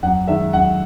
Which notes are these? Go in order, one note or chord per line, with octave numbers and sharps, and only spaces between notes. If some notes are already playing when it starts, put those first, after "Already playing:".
F#2 F#5
D#3 G#3 E5
F#2 F#5